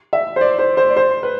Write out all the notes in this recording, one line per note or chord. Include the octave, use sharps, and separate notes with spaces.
E5
C5
D5
C5
C5
D5
C5
B4